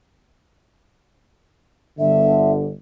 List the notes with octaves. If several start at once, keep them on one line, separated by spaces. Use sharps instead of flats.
G1 D3 E5